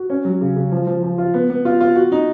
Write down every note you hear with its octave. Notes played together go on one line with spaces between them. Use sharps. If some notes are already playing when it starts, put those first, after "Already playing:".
Already playing: F#4
C#4
F#3
C#3
C#3
F3
F3
F3
F4
B3
B3
F4
F4
F#4
D#4